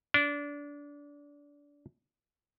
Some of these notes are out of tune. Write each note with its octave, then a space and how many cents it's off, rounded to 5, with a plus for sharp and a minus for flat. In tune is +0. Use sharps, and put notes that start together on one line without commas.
D4 -25